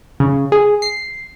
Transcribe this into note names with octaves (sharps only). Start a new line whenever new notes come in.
C#3
G#4
C7